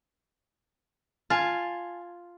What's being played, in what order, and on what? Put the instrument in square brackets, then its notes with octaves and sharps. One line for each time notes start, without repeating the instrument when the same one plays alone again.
[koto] F4 [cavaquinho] G#5 A5